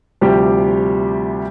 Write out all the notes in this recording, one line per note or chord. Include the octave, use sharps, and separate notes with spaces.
D2 C3 F3 G3 G4